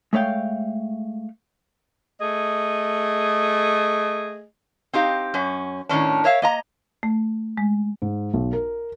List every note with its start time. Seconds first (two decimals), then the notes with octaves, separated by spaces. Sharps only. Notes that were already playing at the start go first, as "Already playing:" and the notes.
0.13 G#3 A3 C#5 F5 G5
2.21 A3 G#4 D#5
4.93 C4 D#4 G4 F5
5.34 F#2 C#4
5.89 A2 D#3 C#4 D4
6.24 A#4 C#5 E5 F5
6.42 A#3 D#5 A#5
7.03 A3
7.57 G#3
8.02 G#2
8.34 B1
8.53 A#4